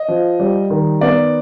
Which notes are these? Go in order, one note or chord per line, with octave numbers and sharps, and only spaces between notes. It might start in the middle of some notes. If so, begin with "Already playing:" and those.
Already playing: D#5
F3
G3
D#3
B3 D5